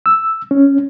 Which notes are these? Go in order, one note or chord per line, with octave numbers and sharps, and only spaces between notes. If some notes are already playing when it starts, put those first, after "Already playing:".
E6
C#4